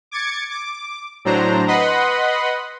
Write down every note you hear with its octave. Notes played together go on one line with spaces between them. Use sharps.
D6 G#6 A6 C#7
D6
A2 F#3 D4 C5 A#5
B4 D#5 F#5 B5 C6